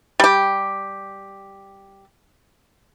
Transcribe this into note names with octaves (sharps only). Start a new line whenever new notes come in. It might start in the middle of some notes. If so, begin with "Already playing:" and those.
G3 G4